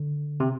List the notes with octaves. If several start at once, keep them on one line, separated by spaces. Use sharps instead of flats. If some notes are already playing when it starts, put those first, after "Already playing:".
Already playing: D3
C3